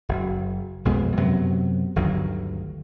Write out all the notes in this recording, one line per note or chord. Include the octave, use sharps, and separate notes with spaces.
F#1
B1 F2 G#3 B3
F#2 C3 F#3 B3
G1 D2 D#3 F#3